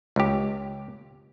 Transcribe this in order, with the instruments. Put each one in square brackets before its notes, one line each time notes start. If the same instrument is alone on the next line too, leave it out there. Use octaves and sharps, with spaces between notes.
[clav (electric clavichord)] C#2 G4